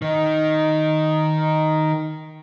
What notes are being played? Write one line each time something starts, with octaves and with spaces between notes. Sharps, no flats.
D#3 D#4